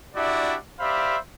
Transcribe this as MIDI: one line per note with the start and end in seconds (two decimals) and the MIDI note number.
0.16 0.55 62
0.16 0.55 64
0.16 0.55 66
0.16 0.55 67
0.16 0.55 74
0.16 0.55 76
0.80 1.16 67
0.80 1.16 72
0.80 1.16 74
0.80 1.16 76
0.80 1.16 77
0.80 1.16 83